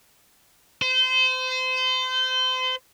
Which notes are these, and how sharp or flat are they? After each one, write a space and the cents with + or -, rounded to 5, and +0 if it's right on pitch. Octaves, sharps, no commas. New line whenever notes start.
C5 -30